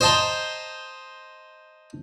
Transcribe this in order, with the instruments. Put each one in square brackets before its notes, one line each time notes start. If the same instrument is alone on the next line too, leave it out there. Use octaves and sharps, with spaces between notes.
[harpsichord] C5 D#5 G5 A5 A#5 C6